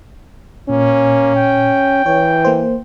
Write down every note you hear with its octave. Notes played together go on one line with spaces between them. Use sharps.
A#2 A#3 C#4
G5
E3 C#5
A#3 C5